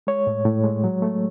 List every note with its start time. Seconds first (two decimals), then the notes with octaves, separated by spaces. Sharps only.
0.07 G#3 C#5
0.27 A2
0.45 A2
0.64 G#3
0.84 F#3
1.02 A3